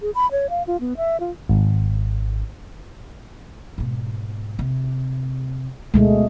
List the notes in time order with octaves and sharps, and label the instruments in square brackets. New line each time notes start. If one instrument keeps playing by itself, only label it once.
[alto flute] G#4
B5
C#5
F5
F4
B3
E5
F4
[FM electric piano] G#1
[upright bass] G#2 B2
C3
[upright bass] D2 [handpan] B2 G#3 A3